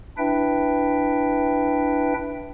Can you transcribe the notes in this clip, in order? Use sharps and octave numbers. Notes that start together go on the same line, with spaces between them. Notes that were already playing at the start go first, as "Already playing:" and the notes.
D4 E4 B4 E5 G5